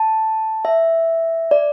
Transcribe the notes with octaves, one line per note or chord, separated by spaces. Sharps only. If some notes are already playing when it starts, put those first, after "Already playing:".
Already playing: A5
E5
D5